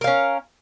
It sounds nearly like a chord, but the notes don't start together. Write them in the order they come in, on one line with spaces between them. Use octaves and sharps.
A#4 F5 C#4